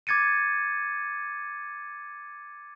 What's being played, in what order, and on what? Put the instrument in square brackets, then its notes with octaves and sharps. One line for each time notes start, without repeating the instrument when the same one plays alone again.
[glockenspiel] D6 G#6 A6 C#7 D#7